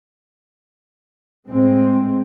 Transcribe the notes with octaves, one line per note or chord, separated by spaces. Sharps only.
A2 G#3 C4